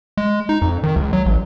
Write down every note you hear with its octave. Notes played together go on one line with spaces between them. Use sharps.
G#3
D#4
F2
D#3
C#2
F#3
A1